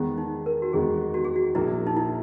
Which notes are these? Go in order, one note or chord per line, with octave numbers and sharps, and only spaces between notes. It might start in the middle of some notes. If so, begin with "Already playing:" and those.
Already playing: E2 D#3 G#3 B3
D#4
A#4
F#4
E2 D#3 G#3 B3 G#4
F#4
G#4
F#4
A#1 A#2 A#3 E4
D#4
E4